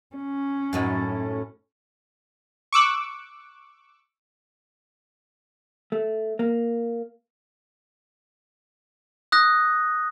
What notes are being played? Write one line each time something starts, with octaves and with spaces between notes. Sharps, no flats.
C#4
F#2 A2 D#4
C#6 D6 E6 F#6
A3
A#3
D#6 F#6 A#6